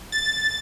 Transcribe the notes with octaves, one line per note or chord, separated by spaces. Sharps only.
A6